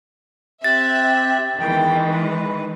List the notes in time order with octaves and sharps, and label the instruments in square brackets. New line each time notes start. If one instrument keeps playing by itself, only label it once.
[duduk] C4 [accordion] G4 F#6 [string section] E5 [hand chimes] A6
[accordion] E2 G5 [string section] D#3 E3 [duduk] G#3
[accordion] B4